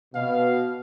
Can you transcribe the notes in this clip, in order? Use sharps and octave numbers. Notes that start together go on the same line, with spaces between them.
B2 F5